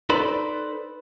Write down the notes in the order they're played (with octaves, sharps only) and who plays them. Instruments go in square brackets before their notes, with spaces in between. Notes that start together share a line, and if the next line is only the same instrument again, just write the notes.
[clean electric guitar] D#4 A4 B4 C5 D5 B5